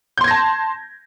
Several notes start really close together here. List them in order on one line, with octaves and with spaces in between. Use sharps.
G6 C6 G#6 A#6 A5